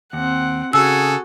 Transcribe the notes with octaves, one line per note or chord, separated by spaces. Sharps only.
D#2 C4 F#5
C#3 F#4 G#4 A4 E6